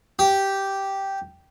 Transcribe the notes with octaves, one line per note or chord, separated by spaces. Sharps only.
G4